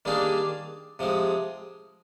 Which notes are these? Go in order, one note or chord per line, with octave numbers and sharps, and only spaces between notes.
D#3 G3 A#3 D4 G#4
C3 F3 G#3